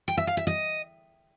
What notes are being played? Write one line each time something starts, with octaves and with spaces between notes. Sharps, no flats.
G5
E5
F5
E5
D#5